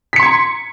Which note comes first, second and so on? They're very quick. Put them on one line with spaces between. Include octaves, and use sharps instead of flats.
B6 C#7 C6 G#6 A#5